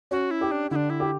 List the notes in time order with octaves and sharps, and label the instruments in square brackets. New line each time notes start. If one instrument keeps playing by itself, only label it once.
[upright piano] C#4 [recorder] F#4
[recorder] E4
[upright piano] G4
[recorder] D4
[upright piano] D3 [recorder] D4 E4
[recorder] E4
[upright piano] G4